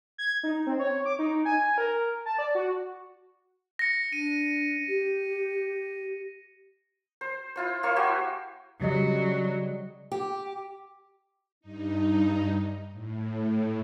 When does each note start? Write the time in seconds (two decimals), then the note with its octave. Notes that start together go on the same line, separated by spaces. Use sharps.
0.18 G#6
0.43 D#4
0.67 C4
0.79 C#5
1.05 D6
1.19 D#4
1.45 G#5
1.78 A#4
2.26 A5
2.38 D5
2.55 F#4
3.79 A#6 C#7
4.13 D4 D#7
4.88 G4
7.21 C5
7.56 E4 F4 C5
7.83 A#3 E4 C5
7.96 F#4 G4 E5 G#5
8.81 C#3 F#3 G3 D#5
10.12 G4
11.61 G2 D#4
12.91 A2